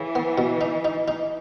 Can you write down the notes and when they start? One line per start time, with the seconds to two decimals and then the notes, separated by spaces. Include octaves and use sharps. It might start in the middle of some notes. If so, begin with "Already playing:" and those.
Already playing: C#3 E3
0.15 B3
0.38 B2
0.61 D#4
0.85 D#4
1.08 D#4